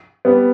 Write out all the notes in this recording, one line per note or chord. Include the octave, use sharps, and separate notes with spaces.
G3 B3